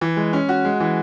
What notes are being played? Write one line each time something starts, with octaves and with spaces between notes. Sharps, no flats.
E3
G#3
C#4
F#4
G#3
E3